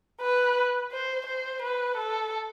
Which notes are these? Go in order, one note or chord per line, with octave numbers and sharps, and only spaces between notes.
B4
C5
C5
B4
A4